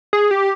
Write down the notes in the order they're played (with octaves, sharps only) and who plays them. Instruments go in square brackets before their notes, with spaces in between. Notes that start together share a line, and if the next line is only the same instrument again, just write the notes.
[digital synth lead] G#4
G4